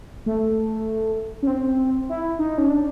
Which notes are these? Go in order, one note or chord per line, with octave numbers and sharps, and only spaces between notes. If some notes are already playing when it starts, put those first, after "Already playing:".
A3
C#4
C4
E4
D#4
C#4
D4